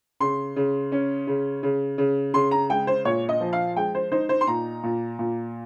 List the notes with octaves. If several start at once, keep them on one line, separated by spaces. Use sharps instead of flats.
C#3 C6
C#3
C#4
C#3
C#3
C#3
C#3 C6
A#5
G#3 G5
C5
A#2 C#5
D#5
F3
F5
G#3 G5
C5
D#4 C5
C5
C6
A#2 A#5
A#2
A#2